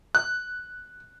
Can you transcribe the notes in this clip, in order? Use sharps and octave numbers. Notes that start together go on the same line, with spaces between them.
F#6